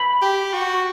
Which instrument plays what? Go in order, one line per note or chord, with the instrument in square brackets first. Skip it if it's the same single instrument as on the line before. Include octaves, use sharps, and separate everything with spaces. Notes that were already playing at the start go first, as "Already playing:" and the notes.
Already playing: [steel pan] B5
[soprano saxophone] G4
F#4